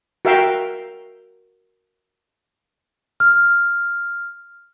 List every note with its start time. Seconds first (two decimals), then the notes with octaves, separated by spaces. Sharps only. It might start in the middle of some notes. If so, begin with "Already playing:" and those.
0.25 F#4 A#4 E5 F5 G5
3.20 F6